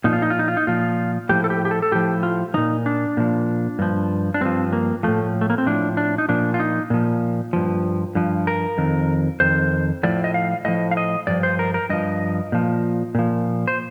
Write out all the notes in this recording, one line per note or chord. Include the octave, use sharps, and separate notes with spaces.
A#2 F3 D#4
F4
D#4
F4
D#4
F4
D#4
A#2 F3 F4
A2 F3 G4
A4
G4
G4
A4
A4
A2 F3 G4
F4
A#2 F3 D#4
D4
A#2 F3
G2 F3
D4
G2 F3 C4
A#3
A2 F3 A3
A3
A#3
C4
A2 F3 D4
D4
D#4
A#2 F3 D4
F4
D#4
A#2 F3
G2 F3
G2 F3
A#4
F2 D#3
F2 D#3 C5
A2 F3 D5
D#5
F5
A2 F3 D#5
F5
D#5
G2 F3 D5
C5
A#4
A#4
G2 F3 D#5
A#2 F3
A#2 F3
C5